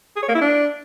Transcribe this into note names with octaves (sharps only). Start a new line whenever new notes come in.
G#4
C#5
A#3
E4
D4